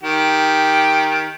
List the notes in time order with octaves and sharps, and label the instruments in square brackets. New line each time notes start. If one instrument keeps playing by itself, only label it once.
[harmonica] D#3 G4